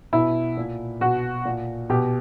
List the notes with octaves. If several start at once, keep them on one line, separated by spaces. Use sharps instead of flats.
B2 E4
A#2
B2 F#4
A#2
B2 G4